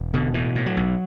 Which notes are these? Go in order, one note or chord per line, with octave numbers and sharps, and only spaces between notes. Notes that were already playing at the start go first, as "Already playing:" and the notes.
Already playing: E1
B2 D3
A2 E3
A2
F#3
B1